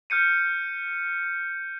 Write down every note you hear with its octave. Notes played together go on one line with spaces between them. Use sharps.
F6 G6 C#7 D#7